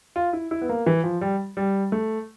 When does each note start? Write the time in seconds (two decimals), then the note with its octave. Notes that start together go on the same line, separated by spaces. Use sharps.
0.16 F4
0.33 E4
0.51 E4
0.61 B3
0.69 A#3
0.86 E3
1.04 F3
1.21 G3
1.57 G3
1.92 A3